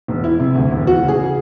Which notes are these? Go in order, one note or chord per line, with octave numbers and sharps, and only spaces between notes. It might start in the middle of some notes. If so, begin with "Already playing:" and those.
E1
E3 E4
C3
D2
E1
E3 F#4
C#3
G#4